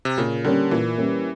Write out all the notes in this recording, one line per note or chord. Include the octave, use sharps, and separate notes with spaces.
C3
A#2 C#3
D3 G3 A#3 C#4
A#2 E3
G3 A#3 C#4